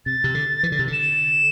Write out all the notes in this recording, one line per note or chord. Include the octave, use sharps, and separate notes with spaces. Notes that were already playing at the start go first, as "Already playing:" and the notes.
C3 A6
C3
D3
E3
D3
C3
D3
E7